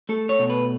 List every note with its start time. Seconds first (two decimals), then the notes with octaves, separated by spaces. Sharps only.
0.09 A3 A4
0.29 C#5
0.39 B2
0.50 B4